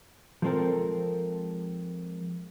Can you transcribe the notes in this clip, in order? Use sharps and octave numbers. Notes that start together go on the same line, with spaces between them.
F3 G#3 B3 C4 A4 A#4